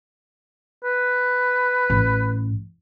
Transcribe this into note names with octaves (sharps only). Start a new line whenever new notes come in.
B4
A1